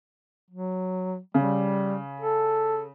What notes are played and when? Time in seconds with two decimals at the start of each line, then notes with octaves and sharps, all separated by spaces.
0.51 F#3
1.34 C#3 G3
2.20 A4